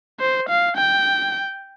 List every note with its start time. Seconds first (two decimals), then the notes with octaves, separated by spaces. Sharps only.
0.20 C5
0.49 F5
0.77 G5